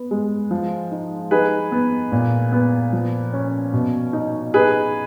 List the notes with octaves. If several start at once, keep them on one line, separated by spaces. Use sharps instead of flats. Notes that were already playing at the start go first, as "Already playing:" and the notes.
Already playing: B3
G#3
F3
D#4
D#4 G#4 B4
B3
A#2
B3
F3
C#4
B2
D#4
D#4 G#4 B4